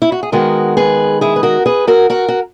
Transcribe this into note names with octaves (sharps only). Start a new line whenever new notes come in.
E4
F#4
G#4
D#3 G#3 B3 F#4 A#4
G#4 B4
E4 G#4
B4
F#4 A#4
G#4 B4
F#4 A#4
F#4 A#4
F#4